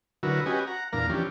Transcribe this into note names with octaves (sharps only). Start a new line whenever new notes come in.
D3 F#3 E4 F#4 A#4 B4
C#4 F#4 G4 B4 D#5 G#5
F#5 A#5
E2 A#2 D4 A#4 F5 A#5
E3 F3 C#4 D4 G4